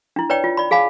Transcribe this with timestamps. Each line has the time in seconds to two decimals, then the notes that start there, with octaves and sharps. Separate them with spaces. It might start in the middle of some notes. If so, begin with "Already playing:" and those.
0.16 D4 E4
0.30 B4 C#5 D5 G5
0.44 F4
0.57 D5 B5
0.71 G#4 F5 G#5 B5